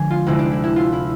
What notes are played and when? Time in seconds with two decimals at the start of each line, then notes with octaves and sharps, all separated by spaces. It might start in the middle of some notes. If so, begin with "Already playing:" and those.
Already playing: D3 F3 G#3 G#4
0.10 F4
0.26 D2 C3 G#3 E4
0.39 D4
0.51 E4
0.64 E4
0.76 F4
0.93 E4